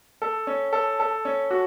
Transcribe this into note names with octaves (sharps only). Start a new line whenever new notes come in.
A4
C#4
A4
A4
C#4
F#4